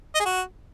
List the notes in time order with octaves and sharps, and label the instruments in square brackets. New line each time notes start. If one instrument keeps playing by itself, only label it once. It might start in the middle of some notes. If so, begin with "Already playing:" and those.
[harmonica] D#5
G#4
F#4